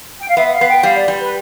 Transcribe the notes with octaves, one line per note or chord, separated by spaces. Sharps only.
G5
F5
B3 E5
E5
F5
B3
G5
G3 F5
D5
G3
B4